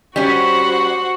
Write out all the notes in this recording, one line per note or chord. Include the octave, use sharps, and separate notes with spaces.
G3 C#4 F#4 C5 F#5